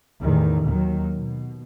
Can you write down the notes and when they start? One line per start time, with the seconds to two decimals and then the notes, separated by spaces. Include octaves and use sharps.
0.21 A1 E2 D#3
0.65 D#2 D#3 F#3
1.16 B2